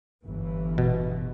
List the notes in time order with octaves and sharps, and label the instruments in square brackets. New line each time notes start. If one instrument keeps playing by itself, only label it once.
[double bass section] G1 E3
[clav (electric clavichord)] B2